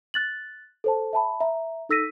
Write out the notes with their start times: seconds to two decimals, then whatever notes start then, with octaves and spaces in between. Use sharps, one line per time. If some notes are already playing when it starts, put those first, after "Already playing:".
0.14 F#6 A6 F#7
0.84 A4 C5 A5
1.13 E5 A5 B5
1.41 E5 A#5
1.89 D#4 A4 E6 A#6 B6 D#7